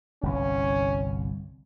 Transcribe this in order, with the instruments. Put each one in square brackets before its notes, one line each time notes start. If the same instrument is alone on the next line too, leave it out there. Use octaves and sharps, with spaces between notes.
[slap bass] G1 C2 [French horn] C#4